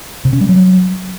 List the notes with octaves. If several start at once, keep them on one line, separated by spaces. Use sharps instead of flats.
C3
C#4
G3
F#3